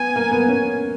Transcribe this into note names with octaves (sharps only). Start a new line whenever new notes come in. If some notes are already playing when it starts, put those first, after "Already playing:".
Already playing: B3 G#5
A#3
B3
C#4